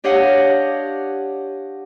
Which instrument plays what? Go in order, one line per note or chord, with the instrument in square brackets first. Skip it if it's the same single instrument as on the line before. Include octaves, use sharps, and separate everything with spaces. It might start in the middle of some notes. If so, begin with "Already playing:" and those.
[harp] D4 G4 C#5 D#5 F5 F#5